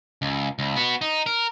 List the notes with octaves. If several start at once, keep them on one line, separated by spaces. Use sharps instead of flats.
C#2
C#2
B3 F#4
D#4
A#4